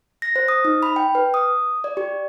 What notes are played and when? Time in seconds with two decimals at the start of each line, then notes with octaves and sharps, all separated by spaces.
0.22 A#6
0.36 C5
0.48 D#6
0.65 D#4
0.83 B5
0.96 G5
1.15 B4
1.34 D#6
1.84 D5
1.97 G4